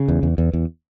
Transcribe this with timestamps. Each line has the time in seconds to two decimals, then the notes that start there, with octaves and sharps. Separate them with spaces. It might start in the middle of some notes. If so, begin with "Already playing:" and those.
Already playing: C#3
0.08 E2
0.23 E2
0.38 E2
0.53 E2